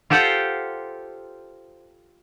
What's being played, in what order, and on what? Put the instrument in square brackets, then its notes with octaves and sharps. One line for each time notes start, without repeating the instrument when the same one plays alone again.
[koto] F4 G4 A4 C5 F#5 G5